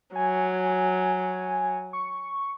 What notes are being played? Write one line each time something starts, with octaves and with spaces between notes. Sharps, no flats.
F#3 G#5
C#6